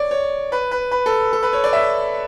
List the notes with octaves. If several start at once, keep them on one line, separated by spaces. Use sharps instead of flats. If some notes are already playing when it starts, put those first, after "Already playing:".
Already playing: C#5 D5
C#5
B4
B4
B4
A4
A4
B4
C#5
D5
E5